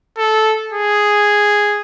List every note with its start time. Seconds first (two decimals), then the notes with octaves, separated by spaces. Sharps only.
0.18 A4
0.73 G#4